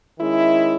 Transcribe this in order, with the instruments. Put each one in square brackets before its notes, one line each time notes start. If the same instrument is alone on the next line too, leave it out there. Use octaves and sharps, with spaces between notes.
[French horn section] D#3 G#3 C#4 E4